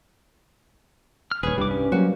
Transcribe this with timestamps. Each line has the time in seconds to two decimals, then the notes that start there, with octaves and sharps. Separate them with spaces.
1.31 F6
1.43 D#1 D#2 G#4 B4 C#5
1.58 C2 G2 G3 D6
1.70 C#4
1.92 F#3 G3 A#3 C4 F#4